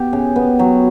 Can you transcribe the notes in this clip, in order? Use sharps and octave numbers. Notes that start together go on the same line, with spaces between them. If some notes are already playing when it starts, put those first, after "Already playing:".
Already playing: B3 G4
C#3
B3
F#3